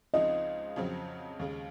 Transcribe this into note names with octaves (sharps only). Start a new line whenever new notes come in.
C#2 C#3 F3 C4 D#4 D#5
F2 C#3 F#3 C4
D#2 C#3 G#3